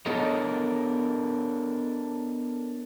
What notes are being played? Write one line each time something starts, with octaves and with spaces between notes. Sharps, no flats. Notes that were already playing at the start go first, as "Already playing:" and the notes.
B3 D4 A4 A#4 C#5 D#5